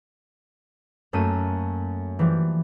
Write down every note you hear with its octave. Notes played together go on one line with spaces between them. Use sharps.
F#2 A3 A#3 E6 D#7
E3 F3 G3